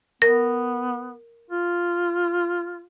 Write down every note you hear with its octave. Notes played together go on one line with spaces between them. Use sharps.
B3 A#4
F4